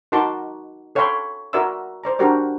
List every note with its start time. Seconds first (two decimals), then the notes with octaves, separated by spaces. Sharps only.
0.12 D#4 F#4 A#4 A5 C6 D6
0.95 A4 C#5 F5 G5 B5 C6
1.53 F#4 A#4 D5 E5 C6 E6
2.04 C5 D5 A#5
2.19 D4 F#4 G4 A#4 C5 D5